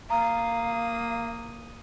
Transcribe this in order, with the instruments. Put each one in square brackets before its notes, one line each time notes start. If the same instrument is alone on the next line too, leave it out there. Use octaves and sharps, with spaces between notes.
[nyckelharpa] A#3 D#6 [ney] F5 [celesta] A#5